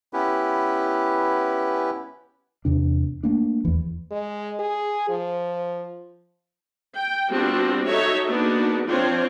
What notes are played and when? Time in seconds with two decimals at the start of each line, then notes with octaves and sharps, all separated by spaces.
0.13 B3 C#4 E4 G4 B4
2.65 E2 C3 D4
3.23 A3 A#3 D4
3.65 E2 E3
4.11 G#3
4.59 G#4
5.09 F3
6.97 G5
7.30 G3 B3 C4 D4 F4 F#4
7.86 D#4 F#4 A4 C#5 E5
8.28 A#3 B3 D4 D#4 F#4 G#4
8.85 F3 C4 D4 F4 C5 C#5